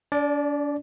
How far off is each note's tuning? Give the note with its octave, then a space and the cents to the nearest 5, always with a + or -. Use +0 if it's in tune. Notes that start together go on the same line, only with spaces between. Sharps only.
D4 -40 D5 +0